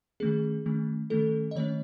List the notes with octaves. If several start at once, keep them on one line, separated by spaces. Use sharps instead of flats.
D#3 A3 C#4 G#4
D#3 A3 C#4
D#3 A3 C#4 A4
D#5
D#3 A3 C#4 C#5